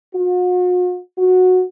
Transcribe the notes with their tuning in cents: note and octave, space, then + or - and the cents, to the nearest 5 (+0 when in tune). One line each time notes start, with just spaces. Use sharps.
F#4 -45
F#4 -10